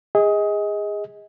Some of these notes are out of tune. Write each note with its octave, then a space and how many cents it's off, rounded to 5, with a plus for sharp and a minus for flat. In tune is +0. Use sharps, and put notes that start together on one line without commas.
G#4 -20 D#5 +25